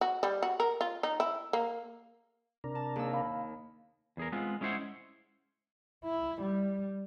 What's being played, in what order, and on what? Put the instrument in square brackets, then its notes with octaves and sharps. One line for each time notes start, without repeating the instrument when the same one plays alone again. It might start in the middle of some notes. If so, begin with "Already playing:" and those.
[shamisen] F#4
G3
F#4
A#4
F4
D#4
E4
A#3
[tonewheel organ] C3 D4 A#4
[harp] A5
[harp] D#2 E6 [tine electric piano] G#4
[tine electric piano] F5 B5
[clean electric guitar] E2 G#4 A#4
G#3 B3 C4 F4
G#3 C#4 E4 C5 F#5
[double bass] E4
G3